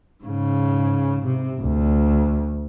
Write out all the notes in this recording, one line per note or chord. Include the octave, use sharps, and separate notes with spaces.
G#2 C#3
C3
D2